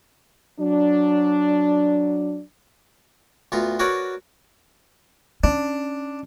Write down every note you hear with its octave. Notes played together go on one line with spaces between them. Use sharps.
F#3 D4
D2 B3 F4 A#5
F#4 A#4 B4 C#5 D5
C#4 D4